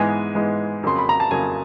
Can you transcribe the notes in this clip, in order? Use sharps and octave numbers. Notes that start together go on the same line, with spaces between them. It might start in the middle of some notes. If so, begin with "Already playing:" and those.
Already playing: G#2 E3 G#3 B3 G#5
G#2 E3 G#3 B3
F2 C#3 F#3 A#3 C6
B5
A#5
A5
F2 C#3 F#3 A#3 G#5